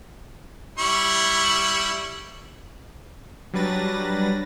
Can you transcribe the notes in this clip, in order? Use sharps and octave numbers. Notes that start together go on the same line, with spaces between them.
G3 E4 C#6
F#3 G3 D4 B4 A6 A#6